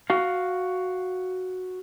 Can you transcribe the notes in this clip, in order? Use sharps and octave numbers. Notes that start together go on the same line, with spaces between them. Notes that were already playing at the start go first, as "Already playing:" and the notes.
F#4 F5